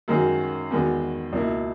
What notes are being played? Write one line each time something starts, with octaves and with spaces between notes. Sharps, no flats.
F#2 D#3 G#3 C#4 F#4
E2 D#3 G#3 B3 F#4
C#2 B2 A#3 E4